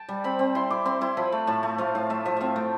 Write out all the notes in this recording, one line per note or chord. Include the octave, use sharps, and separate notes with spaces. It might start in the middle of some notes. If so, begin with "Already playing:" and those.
Already playing: G5 A5
G3
C4 B5
C4
E4 C6
E4 D6
C4 C6
E4 C6
F3 B5
A3
A2 A5
A3
F3 F5
A2 F5
A3 E5
F3 E5
C4 E5 F5
A3 G5